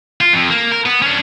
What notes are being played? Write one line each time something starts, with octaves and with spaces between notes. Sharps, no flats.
F4
F2
A#3
A#4
B3
C#4 D4